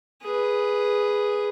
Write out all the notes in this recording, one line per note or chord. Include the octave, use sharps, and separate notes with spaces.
G#4 B4